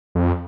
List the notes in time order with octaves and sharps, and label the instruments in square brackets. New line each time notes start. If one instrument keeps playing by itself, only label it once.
[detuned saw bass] F2